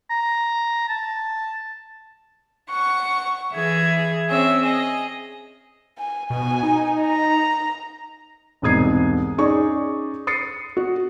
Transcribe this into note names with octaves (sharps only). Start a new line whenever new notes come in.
A#5
A5
F#5 C#6
E3 G#4 E5 G#6
C4 C#4 G#4 E5
G#4 D#5
G#5
B2 G#5
D#4
A#5
E1 C2 G#2 D#6 G#6 C7
C#4 D#4 G#4 D5 C#6
D#6 A6 C7 C#7
F#4